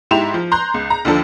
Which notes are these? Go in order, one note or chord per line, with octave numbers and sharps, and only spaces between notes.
G#2 E4 G4 C6 E7 F7
F3
A#5 C6 F#6 G6
C#2
A#5
D#2 D3 F3 A4